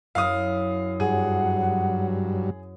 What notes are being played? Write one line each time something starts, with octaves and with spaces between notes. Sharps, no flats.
F#2 E4 F5 D#6
G2 F#3 G#4 F#5